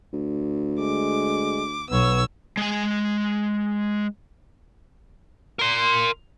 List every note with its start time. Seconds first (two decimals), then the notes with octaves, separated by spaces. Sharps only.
0.13 D2
0.79 G#3 D6
1.90 B1 B3 C#5 E6
2.57 G#3 G#5
5.59 A#4 C6